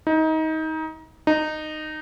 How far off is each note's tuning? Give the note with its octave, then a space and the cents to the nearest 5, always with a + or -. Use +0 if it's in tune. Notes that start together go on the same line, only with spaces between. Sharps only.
D#4 +25
D#4 -15